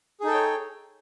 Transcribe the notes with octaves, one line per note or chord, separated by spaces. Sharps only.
D#4 G#4 A4 C#5 G5